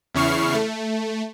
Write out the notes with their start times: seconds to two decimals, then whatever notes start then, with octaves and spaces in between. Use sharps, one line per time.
0.14 E2 C#3 E4 C#6 F6 C7
0.55 A3